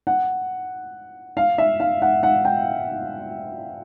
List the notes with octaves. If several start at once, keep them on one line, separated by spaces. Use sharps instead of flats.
F#5
F5
E5
F5
F#5
F#5
G5